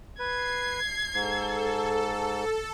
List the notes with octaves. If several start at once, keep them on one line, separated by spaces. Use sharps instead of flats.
B4 G#6 C7
G#2 A4